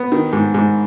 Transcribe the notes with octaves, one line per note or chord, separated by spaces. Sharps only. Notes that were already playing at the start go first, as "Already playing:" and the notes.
Already playing: B3
D#3
G#2
G#2